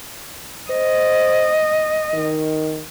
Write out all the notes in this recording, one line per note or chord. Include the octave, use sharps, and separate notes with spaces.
C5 D#5
D#3